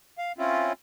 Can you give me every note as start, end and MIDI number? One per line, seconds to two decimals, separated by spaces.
0.18 0.32 77
0.38 0.73 60
0.38 0.73 61
0.38 0.73 64
0.38 0.73 65